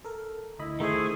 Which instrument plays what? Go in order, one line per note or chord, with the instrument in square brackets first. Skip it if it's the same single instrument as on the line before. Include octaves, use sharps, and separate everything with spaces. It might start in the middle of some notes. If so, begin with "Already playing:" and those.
[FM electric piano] A4 A#4
[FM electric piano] D2 D#5 B5 [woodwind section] E4
[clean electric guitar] D#3 A3 [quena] G#4 [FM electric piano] A#4 C5